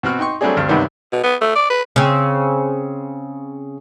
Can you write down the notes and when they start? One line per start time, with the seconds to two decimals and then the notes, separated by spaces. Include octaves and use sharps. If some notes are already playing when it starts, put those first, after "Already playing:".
0.03 B2 C4 F#4 F6
0.19 D#4 G5 C6 C#6
0.41 F#3 G3 A3 C4 D4 G#4
0.57 D2 G2 C4 F6
0.69 B1 F#2 C3 D#3 G3 B3
1.12 B2
1.24 B3
1.41 A3
1.55 D5
1.70 B4
1.96 C#3 C4